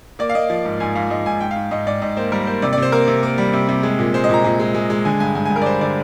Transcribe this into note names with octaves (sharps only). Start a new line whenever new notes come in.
A#3 D5
F5
A#3 D#5
F3
G#2
G#2 G#5
G#2 F5
G#2 D#5
G#2 G#5
G#2 G5
G#2 F5
G#2 D#5
G#2 D5
G#2 D#5
A#3 C5
G3 A#4
A#3 C5
C3 D5
C3 D5
C5
A#3 A#4
C3
A#3
G3
C3
C3
G#3
A#2
G#3 C5
D#5
A#2 A#5
A#2
G#3
G#3
G#3
D3 G#5
G2 G#5
G2 G#5
G2 G#5
A#4
D5
G3 C5
D3 D5